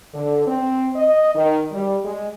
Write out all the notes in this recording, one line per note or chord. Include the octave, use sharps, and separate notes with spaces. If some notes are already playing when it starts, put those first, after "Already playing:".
D3
C4
D#5
D#3
G3
G#3